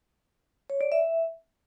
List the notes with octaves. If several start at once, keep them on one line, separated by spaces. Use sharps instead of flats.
C#5
D5
E5